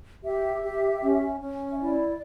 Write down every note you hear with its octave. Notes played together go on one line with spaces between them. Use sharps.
G4 E5
G4
C#4
C#4
E5
E4 D5